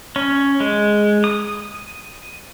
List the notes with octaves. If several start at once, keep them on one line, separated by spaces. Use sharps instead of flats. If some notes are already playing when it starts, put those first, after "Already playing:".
C#4
G#3
D#6